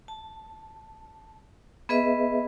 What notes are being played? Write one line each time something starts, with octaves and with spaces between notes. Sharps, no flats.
A5
B3 G#4 B4 D#5 E5